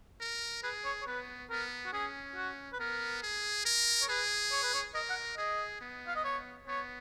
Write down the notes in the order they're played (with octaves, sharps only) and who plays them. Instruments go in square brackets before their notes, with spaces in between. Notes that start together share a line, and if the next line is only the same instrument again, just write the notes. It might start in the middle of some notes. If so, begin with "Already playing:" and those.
[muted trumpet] A#4
[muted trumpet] G#4 [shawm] B4
[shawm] C#5
C#5
[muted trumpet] B3 [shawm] B4
[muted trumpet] B3 [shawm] A#4
[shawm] F#4
[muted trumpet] C#4 [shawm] G#4
[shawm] F#4
B4
[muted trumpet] B3 [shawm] A#4
[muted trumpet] G#4
A#4
[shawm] C#5
[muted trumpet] G#4 [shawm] B4
[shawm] C#5
B4
C#5
[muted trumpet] A#4 [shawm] D#5
[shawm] F#5
[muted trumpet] G#4 [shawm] D#5
[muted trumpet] B3
[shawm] F5
D#5
C#5
[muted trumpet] B3 [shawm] C#5